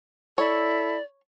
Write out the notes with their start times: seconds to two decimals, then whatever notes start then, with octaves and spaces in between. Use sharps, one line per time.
0.38 E4 A4 C#5 D5